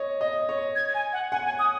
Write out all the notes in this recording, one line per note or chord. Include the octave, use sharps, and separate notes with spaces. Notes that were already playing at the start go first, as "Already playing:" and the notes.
Already playing: C#5 D#5
D#5
C#5
G#6
G#5
F#5
F#5 G#5
G#5
D#6